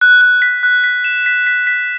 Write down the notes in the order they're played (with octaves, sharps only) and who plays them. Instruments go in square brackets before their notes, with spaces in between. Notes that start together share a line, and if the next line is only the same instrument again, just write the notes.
[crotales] F#6
F#6
B6
F#6
B6
E7
B6
B6
B6